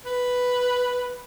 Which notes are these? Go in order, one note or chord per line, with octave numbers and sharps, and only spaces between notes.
B4